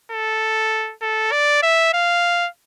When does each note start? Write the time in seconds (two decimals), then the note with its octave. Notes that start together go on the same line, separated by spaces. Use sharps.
0.12 A4
1.02 A4
1.32 D5
1.63 E5
1.93 F5